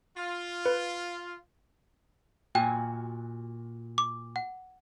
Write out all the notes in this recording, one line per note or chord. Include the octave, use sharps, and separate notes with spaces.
F4
B4
A#2 F#4 G5 G#5
D6
F#5